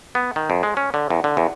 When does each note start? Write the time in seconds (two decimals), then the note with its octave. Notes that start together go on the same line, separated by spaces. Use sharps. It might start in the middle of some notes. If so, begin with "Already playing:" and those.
0.15 B3
0.36 D#3
0.50 F2
0.63 G#3
0.77 C#4
0.94 D3
1.10 E2
1.24 D3
1.37 E2